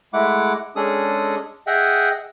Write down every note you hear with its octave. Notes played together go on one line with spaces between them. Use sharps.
G#3 A3 E4 F#5 D6
G#3 C#4 D4 G#4 A4 D#6
G#4 D#5 E5 F#5 G5